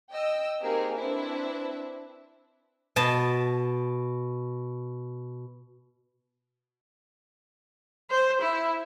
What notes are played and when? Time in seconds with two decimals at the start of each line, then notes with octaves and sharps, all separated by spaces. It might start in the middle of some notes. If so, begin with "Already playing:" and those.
0.12 D#5 G5 E6
0.62 A#3 C4 D#4 G4 G#4 A#4
0.97 C4 D4 E4 B4 E5
2.96 B2 A5
8.10 C5
8.42 E4